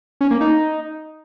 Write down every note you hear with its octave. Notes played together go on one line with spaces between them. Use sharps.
C#4
A#3
D#4